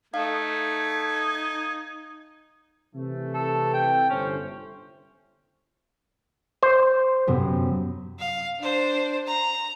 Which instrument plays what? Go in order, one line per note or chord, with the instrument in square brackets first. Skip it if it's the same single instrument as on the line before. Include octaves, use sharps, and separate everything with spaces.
[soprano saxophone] A3 [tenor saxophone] D#4 [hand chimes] F5 [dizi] G#6
[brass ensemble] C3 E3 A3
[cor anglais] A4
G5
[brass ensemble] G1 A3 C5 [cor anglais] C#4
[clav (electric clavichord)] C5
[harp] F#2 C3 B3
[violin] F5
D4 C5
A#5